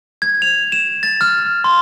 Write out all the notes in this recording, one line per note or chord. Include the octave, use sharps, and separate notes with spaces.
G#6
F7
E7
A6
F6
C6